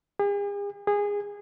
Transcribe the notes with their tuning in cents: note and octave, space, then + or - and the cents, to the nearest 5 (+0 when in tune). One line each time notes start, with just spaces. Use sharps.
G#4 -45
G#4 -20